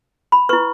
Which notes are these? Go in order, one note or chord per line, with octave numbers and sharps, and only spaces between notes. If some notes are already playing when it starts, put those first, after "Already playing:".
B5
E4 B4 C#6